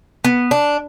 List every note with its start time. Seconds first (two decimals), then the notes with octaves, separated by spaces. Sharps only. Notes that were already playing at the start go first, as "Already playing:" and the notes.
0.24 B3
0.51 D4